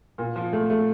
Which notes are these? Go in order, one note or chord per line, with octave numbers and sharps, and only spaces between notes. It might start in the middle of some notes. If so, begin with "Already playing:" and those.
A#2
F3
A3
A3